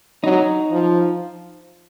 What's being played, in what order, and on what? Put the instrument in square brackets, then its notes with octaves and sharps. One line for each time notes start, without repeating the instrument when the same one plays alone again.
[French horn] F#3 [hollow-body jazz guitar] D#4
[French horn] F3